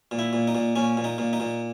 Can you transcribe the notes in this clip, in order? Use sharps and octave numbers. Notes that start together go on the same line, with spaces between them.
A#2
E4
A#2
D#4
A#2
A#2 C#4
A#2
D#4
A#2
D#4
A#2